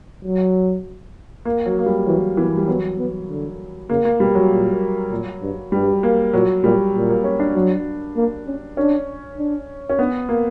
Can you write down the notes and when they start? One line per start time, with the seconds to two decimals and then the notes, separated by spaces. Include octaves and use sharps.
0.24 F#3
1.45 A#3
1.66 F#3
1.79 A#3
1.86 G3
2.07 E3 F#3
2.37 E3 B3
2.57 G3
2.68 F#3 B3
2.98 B3
3.29 D3
3.89 C#3 A#3
4.05 A#3
4.20 B2 G3
4.35 F#3
4.50 A#2
5.11 A#2
5.42 G2
5.72 G2 G3
6.03 A#3
6.33 A#2 F#3
6.64 A#2 G3
6.94 A#2
7.09 A#3
7.24 C#4
7.39 D4
7.55 F#3
8.16 A#3
8.46 C#4
8.77 C#4 D4
9.38 D4
9.89 C#4
9.99 B3 D4
10.29 A#3